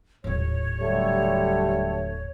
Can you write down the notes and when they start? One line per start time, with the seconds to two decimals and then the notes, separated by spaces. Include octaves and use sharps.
0.24 D#1 A2 C#5
0.80 D3 F#3 G3 A3